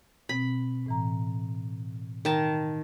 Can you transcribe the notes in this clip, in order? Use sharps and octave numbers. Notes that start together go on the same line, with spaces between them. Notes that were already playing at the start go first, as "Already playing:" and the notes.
B2 C4 B5
A2 E3 A#5
D#3 A5 A#5